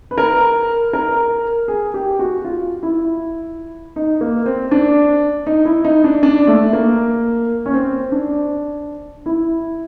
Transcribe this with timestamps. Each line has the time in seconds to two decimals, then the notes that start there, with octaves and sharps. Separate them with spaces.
0.11 B4
0.18 A#4
0.93 A#4
1.68 G#4
1.94 G4
2.19 F#4
2.45 F4
2.83 E4
3.96 D#4
4.21 A#3
4.46 C4
4.71 D4
5.46 D#4
5.65 E4
5.85 D#4
6.04 D4
6.23 D4
6.47 A3
6.73 A#3
7.66 C#4
7.74 C4
8.12 D4
9.26 E4